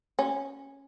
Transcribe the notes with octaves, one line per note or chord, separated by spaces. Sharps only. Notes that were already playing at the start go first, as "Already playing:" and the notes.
C#4